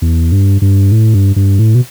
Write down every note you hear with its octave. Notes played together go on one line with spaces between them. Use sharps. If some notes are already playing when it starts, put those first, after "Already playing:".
E2
G2
G2
A2
G2
G2
A2
B2